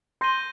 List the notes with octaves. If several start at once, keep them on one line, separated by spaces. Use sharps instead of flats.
C6 G6 A#6 D#7 G7